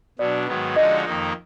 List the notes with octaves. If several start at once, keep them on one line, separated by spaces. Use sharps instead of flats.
B2 F#3 D4 D5
G#2 D#3 F#3 B3
D3 F3 G#3 D#4 F#4 D#5
F2 D#3 A#3 D#4